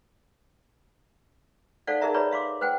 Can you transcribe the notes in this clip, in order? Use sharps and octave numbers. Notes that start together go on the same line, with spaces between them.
D#4 A4 C5 D5 F5 F#5
D#4 G#4 A#4 E5 A#5
G#4 B4 C#5 D5 A#5 B5
E5 F5 C6 D6
B4 C5 F#5 G5